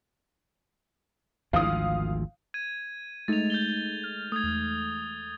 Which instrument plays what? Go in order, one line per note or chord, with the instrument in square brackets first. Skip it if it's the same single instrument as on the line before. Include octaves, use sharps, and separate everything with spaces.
[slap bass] G#1 D2 F3 [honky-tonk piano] F5 D#6
[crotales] G#6 D#7
[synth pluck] G#3 A3 D#4 [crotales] A6 F7
[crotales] G6 A6 G7
[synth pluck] F6
[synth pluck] A3 [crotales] D#6 G#6
[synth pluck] E2